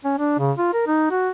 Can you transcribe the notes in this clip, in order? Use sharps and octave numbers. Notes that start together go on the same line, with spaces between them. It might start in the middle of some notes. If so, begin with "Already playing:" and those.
C#4
D4
C#3
F4
A#4
D#4
F#4